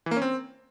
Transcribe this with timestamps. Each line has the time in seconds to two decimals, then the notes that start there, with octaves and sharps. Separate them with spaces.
0.06 E3
0.11 A#3
0.16 C#4
0.22 C4